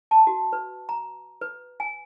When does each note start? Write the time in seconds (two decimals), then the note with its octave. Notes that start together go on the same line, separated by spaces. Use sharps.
0.11 A5
0.27 F#4
0.53 B4
0.89 A#5
1.41 B4
1.80 G#5